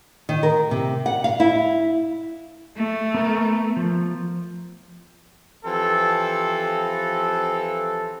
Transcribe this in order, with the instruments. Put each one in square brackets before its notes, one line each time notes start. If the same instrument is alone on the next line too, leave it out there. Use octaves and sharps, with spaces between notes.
[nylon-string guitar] D#3
A#4
C3
F#5
F5
E4
[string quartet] A3
[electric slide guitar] B3 A#4
F3
[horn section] E3 F3 C4 G4 A4